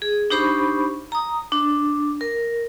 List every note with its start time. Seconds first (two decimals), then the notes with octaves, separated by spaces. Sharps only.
0.02 G#4
0.30 D4 D#4 G4 C5 B5 C#6
1.12 A#5 D#6
1.52 D4
2.21 A#4